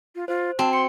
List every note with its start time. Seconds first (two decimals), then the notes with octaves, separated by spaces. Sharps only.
0.15 F4
0.28 F4 C5
0.59 C4 F#4 A5
0.73 C6 C#7